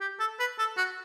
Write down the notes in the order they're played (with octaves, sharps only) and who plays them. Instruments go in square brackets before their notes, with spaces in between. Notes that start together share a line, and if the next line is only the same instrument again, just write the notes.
[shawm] G4
A4
B4
A4
F#4